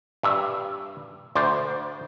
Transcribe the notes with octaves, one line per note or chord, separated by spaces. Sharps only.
G2 E5
D2 C5 D5